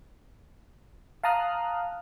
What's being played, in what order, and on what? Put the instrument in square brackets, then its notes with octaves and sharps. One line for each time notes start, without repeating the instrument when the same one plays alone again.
[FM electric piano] F5 A5 A#5 D#6 F6 F#6